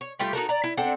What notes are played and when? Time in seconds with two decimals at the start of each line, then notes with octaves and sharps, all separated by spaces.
0.01 C#5
0.19 G3 A3 F4 G4
0.33 D#4 F#4 A4 A#4
0.49 D5 A#5
0.64 E4
0.77 C4 D4 A4 F#5